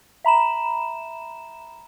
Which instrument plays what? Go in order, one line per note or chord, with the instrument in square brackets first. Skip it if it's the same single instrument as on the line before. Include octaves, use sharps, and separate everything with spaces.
[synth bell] E5 A#5 B5 E7